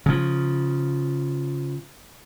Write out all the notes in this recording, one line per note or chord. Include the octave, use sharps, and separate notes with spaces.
C#3 F3